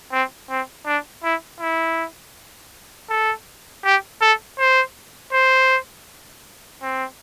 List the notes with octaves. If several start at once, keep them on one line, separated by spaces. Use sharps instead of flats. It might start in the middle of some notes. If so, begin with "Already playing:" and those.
C4
C4
D4
E4
E4
A4
G4
A4
C5
C5
C4